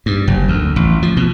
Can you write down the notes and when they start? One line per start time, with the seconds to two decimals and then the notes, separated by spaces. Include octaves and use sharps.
0.06 G2
0.27 F#1
0.48 D2
0.76 A1
1.02 F3
1.17 B2